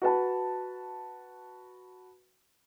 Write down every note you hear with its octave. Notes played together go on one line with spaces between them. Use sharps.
F#4 B4 A5